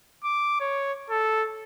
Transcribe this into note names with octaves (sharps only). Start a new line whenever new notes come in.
D6
C#5
A4